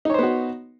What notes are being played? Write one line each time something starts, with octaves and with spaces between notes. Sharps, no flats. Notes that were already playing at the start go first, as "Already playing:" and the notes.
B3 D#4 F#4 C5 C#5